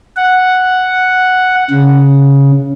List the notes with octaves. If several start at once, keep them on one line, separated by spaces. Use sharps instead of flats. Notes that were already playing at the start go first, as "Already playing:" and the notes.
F#5
C#3